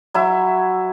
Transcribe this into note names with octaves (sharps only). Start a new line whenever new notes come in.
F#3 E4 E5